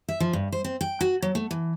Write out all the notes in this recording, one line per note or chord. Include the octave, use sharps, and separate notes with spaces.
E5
F3
G2
C5
C4
G5
F#4
F#3
A3
E3